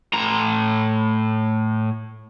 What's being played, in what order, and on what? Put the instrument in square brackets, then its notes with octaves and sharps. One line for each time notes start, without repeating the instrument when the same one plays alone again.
[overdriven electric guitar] A2 A#5